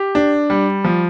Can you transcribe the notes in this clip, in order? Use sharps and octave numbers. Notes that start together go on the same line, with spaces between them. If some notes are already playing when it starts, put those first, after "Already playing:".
Already playing: G4
D4
G3
F3